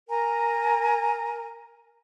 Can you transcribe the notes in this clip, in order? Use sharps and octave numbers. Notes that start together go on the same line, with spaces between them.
A#4 G#5 A#5